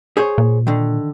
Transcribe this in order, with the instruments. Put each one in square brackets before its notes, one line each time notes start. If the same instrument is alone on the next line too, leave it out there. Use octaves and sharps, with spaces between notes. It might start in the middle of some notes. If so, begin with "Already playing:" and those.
[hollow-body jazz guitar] G#4 C5 C#5
[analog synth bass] A#2
[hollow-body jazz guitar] D3 D#3